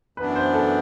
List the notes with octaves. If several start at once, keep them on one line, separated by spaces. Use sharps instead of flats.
F#2 E3 B3 D4 B4
C5
A4